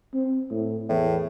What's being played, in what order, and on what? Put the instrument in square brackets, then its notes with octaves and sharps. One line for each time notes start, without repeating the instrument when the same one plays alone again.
[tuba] C4
A2
[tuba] E2 [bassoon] A2